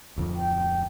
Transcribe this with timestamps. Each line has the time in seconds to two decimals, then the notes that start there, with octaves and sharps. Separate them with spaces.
0.16 D1 F2 F3
0.36 G5